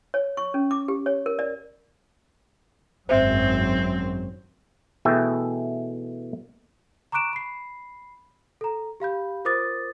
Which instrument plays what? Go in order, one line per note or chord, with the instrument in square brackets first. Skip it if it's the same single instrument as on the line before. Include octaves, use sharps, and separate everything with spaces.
[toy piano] C#5
C#6
C#4
D6
G4
C#5
A#4
D5
[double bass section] G#1 F#2 F#3 [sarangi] C4 [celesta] C5 E5
[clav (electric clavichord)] B2 E3 A3 G#4 E5 G5
[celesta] A#5 C#6 D6 F#6 D7 E7
B5 C7
A4 A#5
G4 F5 B5 G6
F4 A#4 C5 D6 D#6 A6